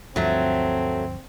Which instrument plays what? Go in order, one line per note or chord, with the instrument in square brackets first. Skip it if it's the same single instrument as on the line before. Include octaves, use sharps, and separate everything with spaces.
[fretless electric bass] D2 G2 F3 [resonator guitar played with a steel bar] F#3 A3 [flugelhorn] C4